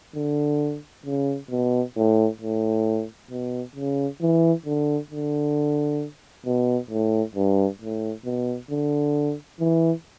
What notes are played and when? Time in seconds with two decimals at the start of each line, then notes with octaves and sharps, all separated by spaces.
0.15 D3
1.06 C#3
1.50 B2
1.96 A2
2.41 A2
3.31 B2
3.76 C#3
4.21 E3
4.66 D3
5.11 D3
6.46 B2
6.91 A2
7.36 G2
7.81 A2
8.25 B2
8.71 D3
9.60 E3